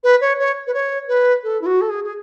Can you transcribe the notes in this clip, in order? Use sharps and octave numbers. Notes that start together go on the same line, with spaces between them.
B4
C#5
C#5
B4
C#5
B4
A4
E4
F#4
A4
G#4
G#4